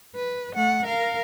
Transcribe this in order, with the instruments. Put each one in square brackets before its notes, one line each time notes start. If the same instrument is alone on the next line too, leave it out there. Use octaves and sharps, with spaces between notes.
[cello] B4
A3 F#5
A#4 F5